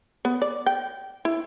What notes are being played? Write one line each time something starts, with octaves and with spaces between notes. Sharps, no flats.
B3
D5
G5
E4